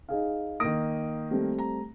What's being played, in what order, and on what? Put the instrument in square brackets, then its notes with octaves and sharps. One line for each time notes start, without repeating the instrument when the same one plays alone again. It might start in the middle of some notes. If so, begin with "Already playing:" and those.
[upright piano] D#4 G#4 F5
[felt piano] D#3 A#3 [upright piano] D#6 A#6 D7
[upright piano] G3 A3 C4
[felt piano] A#5